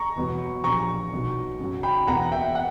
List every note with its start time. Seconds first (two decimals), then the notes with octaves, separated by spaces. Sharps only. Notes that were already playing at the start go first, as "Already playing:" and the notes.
Already playing: A#5 C#6
0.16 E2 B2 F#3
0.64 A#1 A#2 G3 A#5 C#6
1.12 B1 B2 F#3
1.60 F#2 C#3 F#3
1.83 G5 B5
2.07 E1 E2 B2 A#3 F#5 A#5
2.32 E5 G5
2.55 F#5